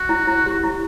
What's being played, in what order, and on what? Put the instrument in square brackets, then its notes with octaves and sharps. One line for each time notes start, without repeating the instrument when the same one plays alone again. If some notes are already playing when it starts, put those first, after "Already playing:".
Already playing: [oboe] F#4
[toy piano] E4
E4
G4
E4